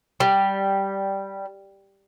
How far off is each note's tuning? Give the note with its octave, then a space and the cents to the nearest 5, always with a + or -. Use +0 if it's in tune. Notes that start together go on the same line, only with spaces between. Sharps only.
G3 -5